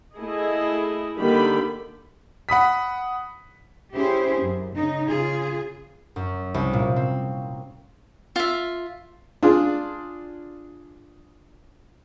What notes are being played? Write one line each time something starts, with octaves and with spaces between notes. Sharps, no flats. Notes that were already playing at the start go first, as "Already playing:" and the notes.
A3 E4 G#4 D#5
D3 D#3 G3 A#3 G4 B5
F#5 B5 D#6 B6
C#4 E4 G4 G#4 C5
F#2
C#3 D#4
C#3 F4 G#4
F#2
C2
A#2
C4
F4 E5
D4 F4 G#4